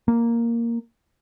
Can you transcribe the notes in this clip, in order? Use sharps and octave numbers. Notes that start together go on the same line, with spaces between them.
A#3